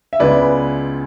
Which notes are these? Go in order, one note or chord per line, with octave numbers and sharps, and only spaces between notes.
E5
C#2 C#3 G#3 B3 E4 B4 D5